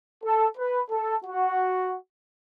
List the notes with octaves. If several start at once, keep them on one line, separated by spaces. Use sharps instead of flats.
A4
B4
A4
F#4